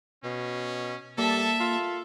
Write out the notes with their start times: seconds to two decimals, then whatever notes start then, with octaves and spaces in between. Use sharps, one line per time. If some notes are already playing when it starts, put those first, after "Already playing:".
0.24 B2 C#4
1.18 G3 A#3 A4 E5 A5
1.60 F4 A4